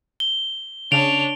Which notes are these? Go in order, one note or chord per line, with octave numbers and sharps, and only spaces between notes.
G7
C#3 D4 C#5 D7 F7